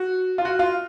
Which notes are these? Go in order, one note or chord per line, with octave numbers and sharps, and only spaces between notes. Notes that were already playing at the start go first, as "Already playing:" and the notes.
Already playing: F#4
F4
F#4
F4